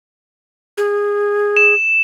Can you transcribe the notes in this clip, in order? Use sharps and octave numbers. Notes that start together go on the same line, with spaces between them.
G#4
E7